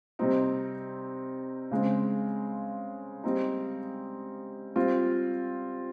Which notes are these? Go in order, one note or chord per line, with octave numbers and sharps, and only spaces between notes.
C3 G3 C4 D#4
C#3 G#3 C4
G3 C4 D#4
G3 C4 F4